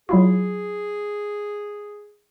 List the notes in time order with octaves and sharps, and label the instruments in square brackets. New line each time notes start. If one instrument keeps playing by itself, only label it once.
[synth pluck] F#3 E4 F4 [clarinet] G#4